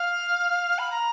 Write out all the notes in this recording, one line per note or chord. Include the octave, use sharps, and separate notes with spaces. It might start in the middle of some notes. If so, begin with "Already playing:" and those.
Already playing: F5
B5
A#5